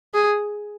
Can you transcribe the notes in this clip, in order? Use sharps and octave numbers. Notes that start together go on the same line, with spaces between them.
G#4